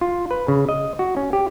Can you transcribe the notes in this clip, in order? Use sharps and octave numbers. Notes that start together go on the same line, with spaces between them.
F4
B4
C#3
D#5
F#4
C#4
G4